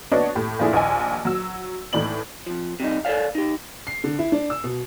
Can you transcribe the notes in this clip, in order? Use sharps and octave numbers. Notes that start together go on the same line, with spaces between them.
B3 D4 F#4 C#5 D#5
A2 G4
A#2 F3 A3 D4 E4 G#4
A#1 D#2 D#5 G#5
F#3 E6
A2 E3 D#4 D5 F#7
F2 F3
C3 G3 D#4
A4 A#4 C5 D5 F5
D#4 G4
C7
D3
E4
D4
E6
B2